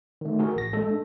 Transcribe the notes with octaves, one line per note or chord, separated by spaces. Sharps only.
D#3 A3
F#4 G#4 A#4
A1 A#6
G#3 A4
D4